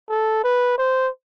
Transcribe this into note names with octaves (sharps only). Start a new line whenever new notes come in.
A4
B4
C5